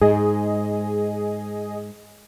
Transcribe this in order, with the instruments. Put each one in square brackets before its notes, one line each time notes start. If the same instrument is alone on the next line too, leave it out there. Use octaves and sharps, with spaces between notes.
[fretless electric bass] G#2 [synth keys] G#4 D#5